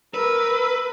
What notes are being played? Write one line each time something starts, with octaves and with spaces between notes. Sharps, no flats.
A#4 B4 E6